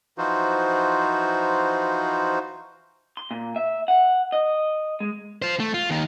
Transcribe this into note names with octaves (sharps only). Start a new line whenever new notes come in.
E3 F3 D#4 F4 F#4 C5
C6
A#2
E5
F#5
D#5
G#3
F4 C5
A3
F4
D#2 D#3